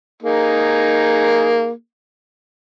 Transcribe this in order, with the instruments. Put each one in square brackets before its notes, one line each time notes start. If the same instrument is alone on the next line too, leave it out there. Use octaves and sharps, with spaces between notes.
[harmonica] A#3 D#4 G#4